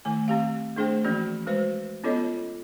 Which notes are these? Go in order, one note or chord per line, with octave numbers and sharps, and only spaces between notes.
D#3 A3 G#5
C4 G4 F5
A3 D4 G#4 C5 G5
E3 F3 A#3 C#4 F#4
G#3 F#4 B4 C5
B3 C#4 F4 A4 C#5 D#5